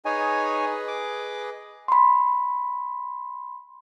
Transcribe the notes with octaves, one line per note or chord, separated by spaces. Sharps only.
D#4 G#4 B4 C#5 D#5 G#5
D6
B5 C6